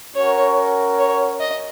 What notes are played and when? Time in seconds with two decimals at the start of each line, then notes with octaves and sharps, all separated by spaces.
0.15 C#4 F#4 A#4 C#5
0.98 C#5
1.40 D#5